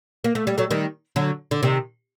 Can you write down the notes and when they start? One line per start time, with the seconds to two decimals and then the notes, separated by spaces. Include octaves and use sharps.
0.24 A#3
0.35 A3
0.47 G3
0.58 F#3 A3
0.71 D#3 G3
1.16 D3 F#3
1.51 D3
1.63 C3 D#3